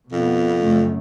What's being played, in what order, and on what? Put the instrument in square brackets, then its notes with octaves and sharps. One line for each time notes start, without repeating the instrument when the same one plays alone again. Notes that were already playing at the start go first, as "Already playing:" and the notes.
[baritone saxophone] F2 [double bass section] B2 B3
[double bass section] F#2 C#3 A3